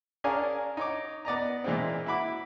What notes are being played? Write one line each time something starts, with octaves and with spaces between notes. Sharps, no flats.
C#4 D4 G#4 A#4 F5 G#5
D#4 C#5 D6
B3 D5 D#5 A#5
A#2 E3 G#3 A#3 C4
E4 F#4 B5 D6